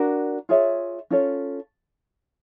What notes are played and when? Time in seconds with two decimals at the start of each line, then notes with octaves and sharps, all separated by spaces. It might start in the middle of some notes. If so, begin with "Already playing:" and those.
Already playing: D4 F#4 A#4
0.49 F4 G#4 C#5 E5
1.10 C#4 F4 A4 C#5